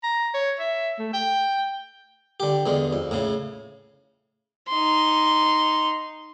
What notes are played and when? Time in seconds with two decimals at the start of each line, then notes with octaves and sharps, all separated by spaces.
0.03 A#5
0.34 C#5
0.59 E5
0.99 A3
1.13 G5
2.40 D3 G4
2.66 E2 D3 G#3
2.93 F2
3.11 A2 C#3
4.69 D#4 C6